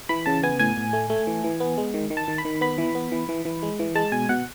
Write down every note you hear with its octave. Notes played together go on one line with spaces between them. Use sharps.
E3 B5
C#3 A5
B3 G#5
A2 G#5
A2
A3
A3
E3
E3
B3
G#3
D#3
D#3
A5
D#3
B5
D#3
B3 B5
E3
B3
E3
E3
E3
G#3
E3
G#3 A5
B2 G#5
B2 F#5